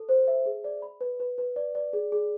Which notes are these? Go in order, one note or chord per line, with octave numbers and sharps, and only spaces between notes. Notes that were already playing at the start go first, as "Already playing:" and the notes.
Already playing: A4
C5
E5
G#4
D5
B5
B4
B4
B4
D5
D5
G#4
G#4